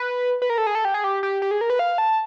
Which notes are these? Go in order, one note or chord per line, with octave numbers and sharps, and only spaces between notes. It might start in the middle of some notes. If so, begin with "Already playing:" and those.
Already playing: B4
B4
A#4
A4
G#4
A4
G4
G#4
G4
G4
G4
G#4
A#4
B4
F5
A5